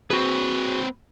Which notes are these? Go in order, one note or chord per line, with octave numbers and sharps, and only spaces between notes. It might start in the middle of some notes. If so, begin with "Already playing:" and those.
C4 F#4 G#4 B4